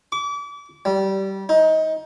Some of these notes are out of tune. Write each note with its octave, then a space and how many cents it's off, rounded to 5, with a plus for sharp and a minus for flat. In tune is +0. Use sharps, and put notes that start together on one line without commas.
D6 -35
G3 -20
D#4 +20